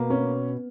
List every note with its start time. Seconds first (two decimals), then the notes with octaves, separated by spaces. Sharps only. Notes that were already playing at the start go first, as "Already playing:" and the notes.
Already playing: B2 A#3
0.10 C#4